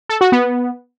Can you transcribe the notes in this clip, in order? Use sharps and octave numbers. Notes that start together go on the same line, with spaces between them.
A4
F#4
B3